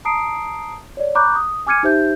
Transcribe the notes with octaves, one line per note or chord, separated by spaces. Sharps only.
A5 A#5 D#6 C7 D7
C#5 D5
A#5 B5 C#6 D6 F#6 G6
D#6
G#5 D6 F6 G#6 C#7 D#7
D#4 G4 C5 E5 G6